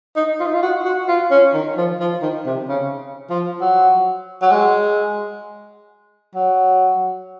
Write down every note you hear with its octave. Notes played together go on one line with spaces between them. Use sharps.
D#4
F4
D#4
F4
F#4
F#4
F4
C#4
D#3
F3
F3
D#3
C3
C#3
F3
F#3
F#3
G#3
F#3